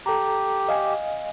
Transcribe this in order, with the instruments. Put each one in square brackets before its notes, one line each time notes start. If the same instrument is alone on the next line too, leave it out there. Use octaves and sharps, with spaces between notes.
[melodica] G4 [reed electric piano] A4 A#5
[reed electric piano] D#5 F5 G#5